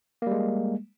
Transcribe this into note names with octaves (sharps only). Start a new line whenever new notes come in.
G3 G#3 A#3